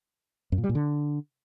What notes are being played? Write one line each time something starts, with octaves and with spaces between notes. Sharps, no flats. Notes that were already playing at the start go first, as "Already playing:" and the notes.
F#2
A#2
G3
A#2
D3